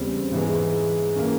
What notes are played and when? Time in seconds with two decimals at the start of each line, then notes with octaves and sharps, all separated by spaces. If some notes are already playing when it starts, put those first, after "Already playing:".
Already playing: E2 C#3 G3 C4
0.31 G#2 E3 G#3
1.16 E3 A#3 C#4